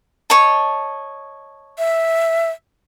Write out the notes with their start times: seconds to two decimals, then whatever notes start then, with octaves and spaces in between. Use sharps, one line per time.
0.30 C#5 D#5 A5
1.78 E5